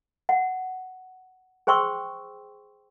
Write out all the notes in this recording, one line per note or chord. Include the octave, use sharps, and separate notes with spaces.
F#5
G#4 C5 G5 C6 C#6 E6